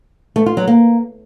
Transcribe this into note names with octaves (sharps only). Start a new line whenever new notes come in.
A3
F4
F#3
A#3